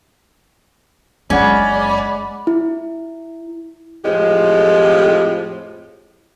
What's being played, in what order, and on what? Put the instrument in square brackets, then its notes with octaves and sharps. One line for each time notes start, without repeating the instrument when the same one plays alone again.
[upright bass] F#1 [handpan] G#3 F#5 [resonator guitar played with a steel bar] C#4 [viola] D5 B5
[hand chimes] E4
[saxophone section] F2 A2 F3 G#3 G4